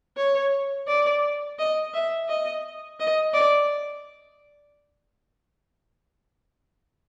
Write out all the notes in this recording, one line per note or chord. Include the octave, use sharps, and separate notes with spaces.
C#5
D5
D#5
E5
D#5
D#5
D5